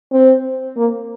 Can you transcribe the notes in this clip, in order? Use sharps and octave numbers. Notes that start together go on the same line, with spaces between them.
C4
A#3